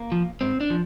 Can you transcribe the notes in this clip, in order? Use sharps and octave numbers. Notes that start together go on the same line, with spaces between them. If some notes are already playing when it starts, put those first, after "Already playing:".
Already playing: A#3
F3
G#2 C4
D4
F3